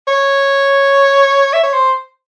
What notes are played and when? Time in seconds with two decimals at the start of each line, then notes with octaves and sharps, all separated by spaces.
0.08 C#5
1.53 E5
1.63 C#5
1.73 C5